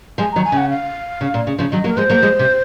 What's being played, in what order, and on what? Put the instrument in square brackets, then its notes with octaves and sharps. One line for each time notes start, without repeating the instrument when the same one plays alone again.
[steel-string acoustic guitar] F3 G#3 [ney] G#5
[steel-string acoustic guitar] D#3 F#3 [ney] A#5
[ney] G#5
[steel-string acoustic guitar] C#3 [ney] F#5
[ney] F5
[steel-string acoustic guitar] C#3
A#2
C#3
C#3 F3
[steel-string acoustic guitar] D#3 F#3 [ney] D#5
[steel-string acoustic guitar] F#3 A#3
[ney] A#4
[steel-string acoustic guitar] F3 G#3 [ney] C5
[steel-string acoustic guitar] F#3 A#3
F3 G#3
C3